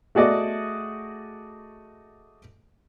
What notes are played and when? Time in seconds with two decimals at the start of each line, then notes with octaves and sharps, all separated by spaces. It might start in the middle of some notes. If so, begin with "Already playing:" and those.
0.15 A3 F#4 G#4 D5 D#5